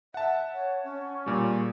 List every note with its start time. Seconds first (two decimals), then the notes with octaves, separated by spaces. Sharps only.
0.14 E5 F#5 A5
0.52 C#5
0.83 C#4
1.26 A#2 G3
1.46 G#4